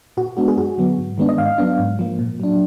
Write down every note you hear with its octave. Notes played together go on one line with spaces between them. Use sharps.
A#2 F#4
G#3 B3 D4 F#4
G#4
F#2 F#4
D3 F#3 B3
G#2
D#3 G#3 B3 D4
D#5
G#2 F5
F#3 B3 D4
G#2
F3 A#3
A#2
F#3 D4